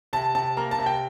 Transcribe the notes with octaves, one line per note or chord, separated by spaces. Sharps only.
C3 A5
C3 A5
A#3 A#5
A5
C3
G5